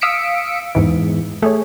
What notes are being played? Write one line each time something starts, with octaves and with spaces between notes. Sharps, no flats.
F5 D#6 E6 B6 C#7 D7
E2 G#2 E3
A3 G#4 C#5